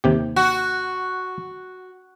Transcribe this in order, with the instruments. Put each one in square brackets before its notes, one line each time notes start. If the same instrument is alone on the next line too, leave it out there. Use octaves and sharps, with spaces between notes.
[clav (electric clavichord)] D#2 C3 G4
[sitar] F#4